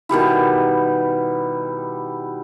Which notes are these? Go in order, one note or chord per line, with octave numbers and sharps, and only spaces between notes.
B2 D#3 G3 E4